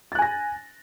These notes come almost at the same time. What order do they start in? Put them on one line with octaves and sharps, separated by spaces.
A6 F#6 G#5 A#6